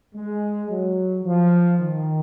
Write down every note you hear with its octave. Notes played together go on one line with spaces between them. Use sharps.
G#3
F#3
F3
D#3